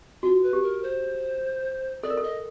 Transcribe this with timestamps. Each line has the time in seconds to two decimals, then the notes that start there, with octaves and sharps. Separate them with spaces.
0.23 F4 F#4
0.43 B4
0.53 G4
0.63 A#4
0.83 C5
2.03 A4 D5
2.10 A#4
2.17 A4
2.24 D#5